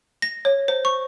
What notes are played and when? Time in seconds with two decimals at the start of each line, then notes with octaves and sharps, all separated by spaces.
0.22 A#6
0.45 C#5
0.68 C5
0.85 C#6